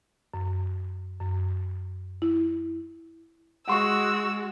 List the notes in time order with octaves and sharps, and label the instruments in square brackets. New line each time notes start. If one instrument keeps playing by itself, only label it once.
[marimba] F#2
F#2
E4
[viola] G#3 F#4 [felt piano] F#5 C6 C#6 [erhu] E6